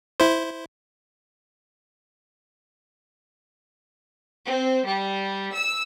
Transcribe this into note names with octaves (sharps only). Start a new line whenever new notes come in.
E4 C5
C4
G3
E6